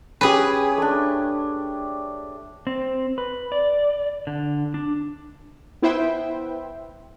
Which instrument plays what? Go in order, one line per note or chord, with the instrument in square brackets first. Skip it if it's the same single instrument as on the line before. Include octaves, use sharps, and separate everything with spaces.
[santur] C#4 G4 [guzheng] G#4 B4
[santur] A3 D4
[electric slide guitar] C4
B4
D5
D3
D4
[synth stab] B3 E4 B4 C5 E5 G5